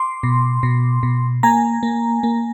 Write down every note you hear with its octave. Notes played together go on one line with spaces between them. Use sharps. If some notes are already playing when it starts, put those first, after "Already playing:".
Already playing: C6 D6
B2
B2
B2
A#3 G#5 A#5
A#3
A#3